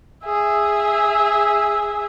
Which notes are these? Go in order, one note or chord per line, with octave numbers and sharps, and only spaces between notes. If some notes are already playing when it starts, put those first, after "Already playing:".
G#4 E5